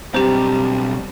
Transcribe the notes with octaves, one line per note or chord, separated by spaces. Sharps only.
B1 G2 C3 G3 C4 G4 C5 A#5